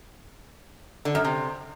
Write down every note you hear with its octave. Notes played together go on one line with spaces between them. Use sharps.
D3
F#2
C3